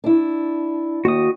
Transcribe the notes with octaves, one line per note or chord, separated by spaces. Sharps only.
D4 E4
D#2 F#4 D#6